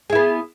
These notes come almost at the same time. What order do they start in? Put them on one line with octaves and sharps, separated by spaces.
G#4 E4 B3